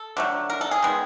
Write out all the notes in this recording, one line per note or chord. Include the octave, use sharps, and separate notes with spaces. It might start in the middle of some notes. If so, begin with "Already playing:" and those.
Already playing: A4
D3 F#3 A3
A#4
A4
G#4
D#3 G#3 B3